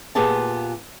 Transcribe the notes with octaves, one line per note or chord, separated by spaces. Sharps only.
A#2 B3 F4 G4 G#4 A5